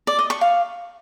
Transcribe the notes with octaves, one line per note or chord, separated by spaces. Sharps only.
D5
D#5
C#6
F5